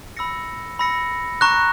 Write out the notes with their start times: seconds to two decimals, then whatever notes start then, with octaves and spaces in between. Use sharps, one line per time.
0.17 B5 E6 A#6 C#7
0.79 B5 E6 A#6 C#7
1.41 A#5 C#6 F#6 A#6